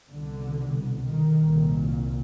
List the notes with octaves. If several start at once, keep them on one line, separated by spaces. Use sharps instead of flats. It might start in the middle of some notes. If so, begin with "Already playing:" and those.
C2 B2 D3
D#3
C2 A#2